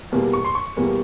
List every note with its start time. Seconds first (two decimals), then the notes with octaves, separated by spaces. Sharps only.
0.12 E2 B2 G3 A#3
0.33 C#6
0.45 C6
0.55 C#6
0.76 E2 B2 G3 A#3